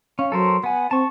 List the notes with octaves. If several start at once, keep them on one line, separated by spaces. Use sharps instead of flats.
C#4 F5
F#3 A4 A#4 C5
B3 F#5 G#5
C4 A5 C#6